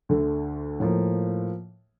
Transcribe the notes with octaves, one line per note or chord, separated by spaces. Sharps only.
D2 D3 A3
A2 F3 A#3